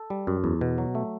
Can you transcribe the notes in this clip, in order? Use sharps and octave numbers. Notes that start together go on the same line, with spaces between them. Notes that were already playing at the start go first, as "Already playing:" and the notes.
Already playing: A4
G3
F#2
E2
B2
F#3
A3